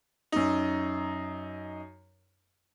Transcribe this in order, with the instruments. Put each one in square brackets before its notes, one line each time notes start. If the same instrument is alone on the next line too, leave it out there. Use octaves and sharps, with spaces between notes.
[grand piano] F#2 D#4